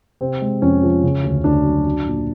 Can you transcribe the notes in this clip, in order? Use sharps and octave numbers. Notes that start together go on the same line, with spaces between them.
C3 C4
G#3
F2 C#4
F3
C#3
D2
D2 D4
F#3
F#3
A#2